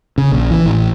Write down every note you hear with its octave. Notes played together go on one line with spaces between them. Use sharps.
C#3
A#1
E3
A1